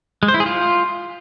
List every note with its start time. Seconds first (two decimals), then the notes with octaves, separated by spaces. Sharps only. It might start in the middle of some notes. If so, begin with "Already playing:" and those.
0.23 G#3
0.28 C5
0.34 E4
0.40 G#4
0.46 F4